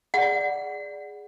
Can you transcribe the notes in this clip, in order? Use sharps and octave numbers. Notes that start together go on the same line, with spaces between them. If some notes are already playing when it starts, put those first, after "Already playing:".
G#4 D5 F#5